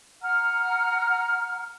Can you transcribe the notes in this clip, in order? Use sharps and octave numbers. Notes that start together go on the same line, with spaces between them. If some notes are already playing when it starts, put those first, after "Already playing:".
F#5 A#5 F6